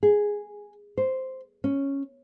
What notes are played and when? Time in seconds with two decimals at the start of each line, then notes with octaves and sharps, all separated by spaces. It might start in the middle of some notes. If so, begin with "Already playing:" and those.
0.03 G#4
0.98 C5
1.64 C#4